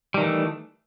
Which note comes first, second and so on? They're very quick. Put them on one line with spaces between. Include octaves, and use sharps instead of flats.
G3 D#3 E3 A3